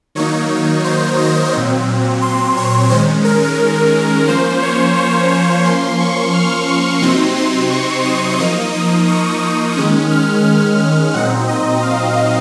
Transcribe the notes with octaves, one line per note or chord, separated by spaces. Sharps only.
D#3 F#3 A#3 D#4 C#5
C5
D#5
A#2 F#3 C4
C6
C#5
D#3 G#3 C#4 C5
A#4
F3 A#3 C#4 C5
C#5
C5
C#5
F3 A#3 C#4 C6
C#6
F6
C#6
C3 F#3 C4 D#4 C6
C6
C#6
D#6
F3 A#3 D#4 D#6
D#6
C#6
D#6
D#3 G#3 C#4 D#6
F6
F6
F6
A#2 F#3 C4 D#4 F#5
D#5
F5